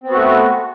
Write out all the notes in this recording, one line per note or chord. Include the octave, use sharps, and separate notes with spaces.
A3 B3 C4 F#4